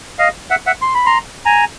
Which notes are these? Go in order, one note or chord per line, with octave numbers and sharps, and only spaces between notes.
D#5 F5
E5 F#5
E5 F#5
C6
B5
A#5 C6
G#5 A#5